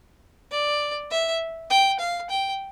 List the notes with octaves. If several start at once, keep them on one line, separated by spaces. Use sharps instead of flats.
D5
E5
G5
F5
G5